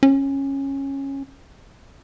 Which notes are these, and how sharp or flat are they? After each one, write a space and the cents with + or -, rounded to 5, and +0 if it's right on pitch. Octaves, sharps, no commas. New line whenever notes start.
C#4 -15